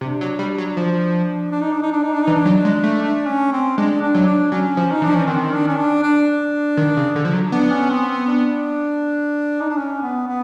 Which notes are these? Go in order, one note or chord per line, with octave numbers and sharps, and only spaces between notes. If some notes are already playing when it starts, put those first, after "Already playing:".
C3 D4
F#3
G3
F#3
F3
D4
D#4
D4
D#4
D4
D#4
D4
E3 D#4
D4
F#3
G#3
A3
D4
C#4
C4
G#3 D4
D4
F#3
D4
F#3 C#4
F3
D#4
E3 D4
F3
E3 C#4
D#3 C4
D4
C#4
D4
D4
D#3
C#3
D3
F3
F#3
B3 D4
C#4
C4
C4
D4
D#4
D4
C#4
B3
B3